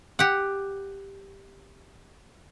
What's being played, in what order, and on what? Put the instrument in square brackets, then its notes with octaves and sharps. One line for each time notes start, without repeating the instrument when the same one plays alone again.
[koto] G4 F#5